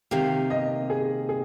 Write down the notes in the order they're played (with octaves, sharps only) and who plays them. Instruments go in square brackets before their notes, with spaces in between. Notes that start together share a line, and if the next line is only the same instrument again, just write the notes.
[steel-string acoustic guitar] C3 D#3 A#3 [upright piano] G4
[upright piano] D#5
G#4
G#4